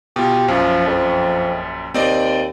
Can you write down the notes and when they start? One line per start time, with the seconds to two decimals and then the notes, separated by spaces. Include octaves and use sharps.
0.16 B2 F4 G4
0.48 A#1 F#2 F3
0.87 F2
1.94 D#2 C4 D5 D#5